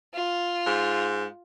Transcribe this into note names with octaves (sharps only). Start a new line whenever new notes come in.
F4
G#2